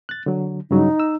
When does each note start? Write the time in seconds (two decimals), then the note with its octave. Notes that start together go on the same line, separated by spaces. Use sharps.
0.09 F#6 A6
0.26 D3 F#3
0.71 G2 C#3 F#3 D#4
1.00 E6